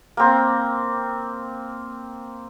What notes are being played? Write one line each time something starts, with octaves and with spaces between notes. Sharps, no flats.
A#3 C4